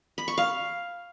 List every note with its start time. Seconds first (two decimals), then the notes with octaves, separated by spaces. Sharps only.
0.18 B5
0.28 C#6
0.38 F5